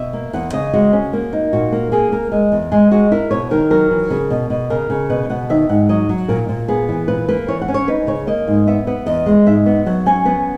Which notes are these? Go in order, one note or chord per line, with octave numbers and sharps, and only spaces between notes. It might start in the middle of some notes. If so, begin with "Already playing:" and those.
Already playing: B2 E5
A#3
E2 F#5
C#3 D#5
G#3 F#4
C#4
A#3
D#4
A#2 F#4
A#3
A#3 G#4
A#3 A#4
G#3
E2
G#3 G#4
G#3 F#4
E4 A#4
B2 C#5
D#3 A#4
F#3 A#4
E3
C#3
B2
B2
C#3 A#4
C#3
B2 B4
B2 F#5
D#3 E5
G#2 F#5
F#3 D#5
F#3
A#2 A#4
A#2
B3 G#4
E3
A#2 B4
A#3 B4
E3 C#5
F#5
C#4
C#5
D#4 B4
C#3 C#5
A#3 D#5
G#2
B3 E5
B3
E2 D#5
G#3
G#2 E5
B3
F#3 F#5
C#4 G#5
B3 F#5